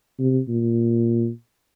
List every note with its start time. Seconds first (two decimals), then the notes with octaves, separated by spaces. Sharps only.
0.19 C3
0.48 A#2